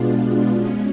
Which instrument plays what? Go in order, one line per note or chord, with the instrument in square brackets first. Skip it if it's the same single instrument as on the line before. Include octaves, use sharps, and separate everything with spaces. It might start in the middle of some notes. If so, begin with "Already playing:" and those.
Already playing: [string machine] B2 G#3 B3 D4 F4
B2 G#3 C#4